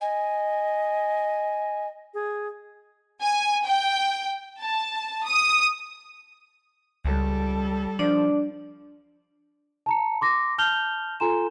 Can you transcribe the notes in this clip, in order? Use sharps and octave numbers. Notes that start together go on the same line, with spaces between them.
D#5 G#5
G#4
G#5
G5
A5
D#6
C#2 G3 A4
F3 D4 D5
A5 A#5 C#7
C6 D6 A#6
A5 F6 G6 F7 G7
F4 A4 G#5 A#5 C6 E7